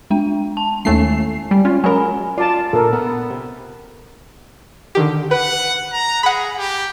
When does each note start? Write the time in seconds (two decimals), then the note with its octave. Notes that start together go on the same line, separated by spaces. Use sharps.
0.11 G#3 D4 G5
0.57 A5
0.85 D#2 G#3 A3 C#4 G#5 C7
1.51 G3
1.65 C#4 F4
1.84 F#3 G#3 A#4 G#5 B5
2.38 F4 D5 A5
2.73 A#2 A4 A#4
2.93 B3
3.30 C3
4.95 D3 D#3 G4
5.31 B4 F#5
5.93 A#5
6.23 G#4 F#5 B5
6.58 G4